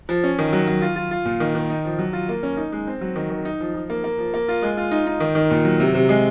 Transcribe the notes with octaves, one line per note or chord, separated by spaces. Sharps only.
F3
C#4
D#3
F#3
F#3
F4
F4
F4
A#2
D#3
D#3
D#4
F3
F#3
F4
A#3
C#4
D#4
G#3
C4
F#3
D#3
D#3
D#4
F3
F3
A#3
A#3
F3
A#3
F4
G#3
F4
D#4
D#4
D#3
D#3
A#2
F#3
C3
C3
G#3